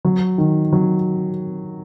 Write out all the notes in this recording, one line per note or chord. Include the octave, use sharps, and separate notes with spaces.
F#3
D#3
F#3